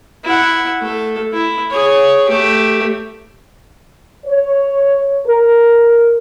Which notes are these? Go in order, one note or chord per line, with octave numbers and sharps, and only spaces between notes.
E4 F#5
A3 A4
E4
G#4 C#5
A3 G4
C#5
A#4